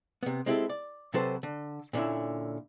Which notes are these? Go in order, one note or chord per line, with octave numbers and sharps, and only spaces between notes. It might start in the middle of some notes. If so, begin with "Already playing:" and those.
C3 B3
G#3 C4 E4 F#4 G4 A4
D5
C3 F#3 A4 B4 C5 A5
D3
A#2 D3 C#4 E4